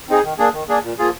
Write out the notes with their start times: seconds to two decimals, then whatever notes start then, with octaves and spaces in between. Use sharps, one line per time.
0.09 C4 D#4 G#4
0.24 D#3
0.39 A#3 D4 G#4
0.54 D#3
0.69 A#3 D4 G#4
0.83 A#2
0.98 F3 A#3 F4 G#4